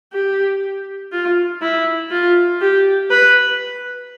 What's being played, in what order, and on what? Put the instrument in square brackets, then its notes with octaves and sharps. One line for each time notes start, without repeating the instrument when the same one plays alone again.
[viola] G4
F4
E4
F4
G4
B4